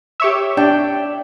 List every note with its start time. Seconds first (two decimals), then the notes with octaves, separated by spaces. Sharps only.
0.20 G4 C#5 E5
0.57 D4 G5